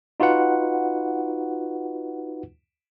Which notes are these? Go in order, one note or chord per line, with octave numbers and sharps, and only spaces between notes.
D#4 F4 F#4 B4 F#5